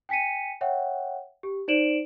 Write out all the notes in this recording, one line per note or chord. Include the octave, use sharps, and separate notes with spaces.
G5 G#5 B6 C#7 D#7
C#5 E5 F#5 G5
G4
D#4 C5 D5 D7 E7 F#7